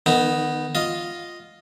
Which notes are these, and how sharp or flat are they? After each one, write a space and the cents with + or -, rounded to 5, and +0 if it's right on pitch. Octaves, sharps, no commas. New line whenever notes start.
D#3 -35 B3 +0 D#4 +0
F4 +0 D#5 +0